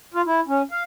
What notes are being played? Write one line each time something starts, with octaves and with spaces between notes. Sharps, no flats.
F4
E4
C#4
F5